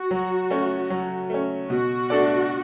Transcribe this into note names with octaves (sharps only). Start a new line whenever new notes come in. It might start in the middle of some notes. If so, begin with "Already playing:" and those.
Already playing: F#4
F#3
A3 C#4
F#3
A3 C#4
B2 F#4
A3 D4 A4 D5